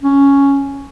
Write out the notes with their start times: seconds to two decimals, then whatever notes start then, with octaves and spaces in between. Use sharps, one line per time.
0.02 C#4